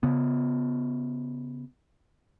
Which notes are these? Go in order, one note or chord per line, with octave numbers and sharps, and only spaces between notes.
C#3 B3